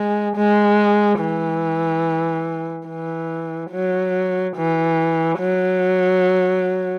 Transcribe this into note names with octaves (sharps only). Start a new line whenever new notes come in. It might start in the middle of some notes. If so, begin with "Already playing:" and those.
Already playing: G#3
G#3
E3
E3
F#3
E3
F#3